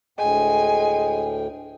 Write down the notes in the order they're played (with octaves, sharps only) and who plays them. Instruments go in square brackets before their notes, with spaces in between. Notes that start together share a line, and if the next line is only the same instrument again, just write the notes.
[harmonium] D2 A2 G5 [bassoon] G#3 [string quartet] G#5